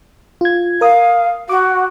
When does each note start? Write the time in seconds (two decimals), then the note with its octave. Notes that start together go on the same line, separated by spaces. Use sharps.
0.41 F4 G#6
0.81 A#4 F5 D#6
1.49 F#4 D6